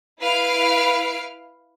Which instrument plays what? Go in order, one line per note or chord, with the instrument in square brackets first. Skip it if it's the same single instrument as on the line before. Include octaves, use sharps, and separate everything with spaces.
[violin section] E4 B4 F5 F6 C7 D7